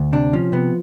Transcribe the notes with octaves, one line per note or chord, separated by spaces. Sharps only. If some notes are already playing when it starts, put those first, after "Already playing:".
Already playing: D2
C3 D4
F3 C#4
C3 B3